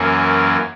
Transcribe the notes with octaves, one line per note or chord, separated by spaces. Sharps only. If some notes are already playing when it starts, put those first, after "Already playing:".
Already playing: F#2 E3 A#3 C#4